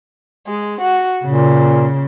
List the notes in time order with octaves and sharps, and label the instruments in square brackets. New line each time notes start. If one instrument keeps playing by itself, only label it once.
[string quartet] G#3
F#4
[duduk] A#2 [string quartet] C#3